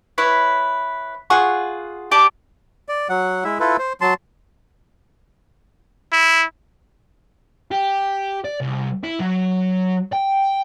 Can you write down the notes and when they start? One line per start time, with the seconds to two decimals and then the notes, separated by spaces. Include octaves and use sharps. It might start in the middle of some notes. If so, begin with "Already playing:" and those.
0.18 E4 B4 C#5
1.30 F4 G#4 F#5 C#6
2.11 G4 D5 A5 D6
2.89 D5
3.09 F#3 F#5
3.44 G#3 E4 E5
3.60 E4 F4 A4 B4
3.79 C5
4.01 F#3 A5 C6
6.13 E4
7.71 G4
8.44 D5
8.60 C2
9.03 E4
9.20 F#3
10.13 G5